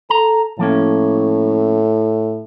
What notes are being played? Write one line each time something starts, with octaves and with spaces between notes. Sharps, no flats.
A4 A#5
A2 F3 A#3 C#4